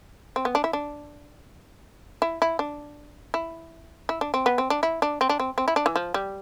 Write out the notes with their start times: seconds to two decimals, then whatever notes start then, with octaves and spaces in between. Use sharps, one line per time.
0.36 C4
0.45 B3
0.55 D4
0.64 E4
0.73 D4
2.22 E4
2.42 E4
2.59 D4
3.34 E4
4.09 E4
4.21 D4
4.34 C4
4.46 B3
4.58 C4
4.70 D4
4.83 E4
5.02 D4
5.21 C4
5.29 D4
5.40 C4
5.58 C4
5.68 E4
5.76 D4
5.86 E3
5.96 F3
6.14 G3